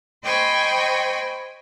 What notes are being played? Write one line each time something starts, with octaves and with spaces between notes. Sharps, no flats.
C5 D#5 G5 G#5 B5 C#6